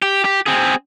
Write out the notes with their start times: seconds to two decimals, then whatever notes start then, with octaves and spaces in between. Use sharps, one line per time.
0.02 G4
0.24 G4
0.46 C4 G#4